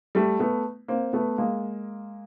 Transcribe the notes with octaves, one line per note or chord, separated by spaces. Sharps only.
G3 A3
A3 B3
A#3 C4
A3 B3
G#3 A#3